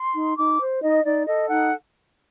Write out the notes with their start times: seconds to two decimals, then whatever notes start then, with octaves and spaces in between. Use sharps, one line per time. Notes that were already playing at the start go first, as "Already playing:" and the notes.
Already playing: C6
0.15 D#4
0.37 D#4 D6
0.60 C5
0.82 D#4 D#5
1.05 D#4 D5
1.27 A4 D#5
1.49 D#4 F#5